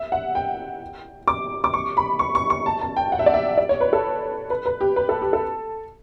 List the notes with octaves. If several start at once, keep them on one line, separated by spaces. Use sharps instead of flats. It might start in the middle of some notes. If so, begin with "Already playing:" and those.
Already playing: E5
F#5
G5
D6
D6
C#6
B5
C#6
C#6
C#6
A5
A5
G5
F#5
E5
D5
E5
D5
C#5
B4
A4
B4
B4
G4
B4
A4
G4
A4